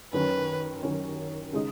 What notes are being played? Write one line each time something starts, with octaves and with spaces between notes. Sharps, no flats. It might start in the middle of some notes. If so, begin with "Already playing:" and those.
F#2 D#3 F#3 C#4 B4
F#2 D#3 F#3 C#4
C#3 G#3 D#4